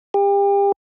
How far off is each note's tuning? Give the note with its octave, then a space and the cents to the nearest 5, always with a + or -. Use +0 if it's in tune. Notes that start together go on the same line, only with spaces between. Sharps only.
G4 +35